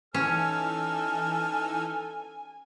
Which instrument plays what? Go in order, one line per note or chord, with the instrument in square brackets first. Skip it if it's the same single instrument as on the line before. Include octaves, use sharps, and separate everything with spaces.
[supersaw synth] E3 D#4 E6 [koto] C#4 [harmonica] A4 F6 [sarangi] G#5